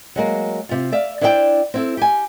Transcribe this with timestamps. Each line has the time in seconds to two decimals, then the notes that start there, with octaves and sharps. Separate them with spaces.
0.16 F#3 G#3 A#3
0.69 C3 F4
0.92 D5 E5 F5
1.21 D4 E4 C5 D5 E5 G5
1.74 C4 E4 A4
1.97 G4 G#5